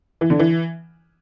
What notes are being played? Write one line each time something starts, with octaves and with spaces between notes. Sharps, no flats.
E3
D3
E3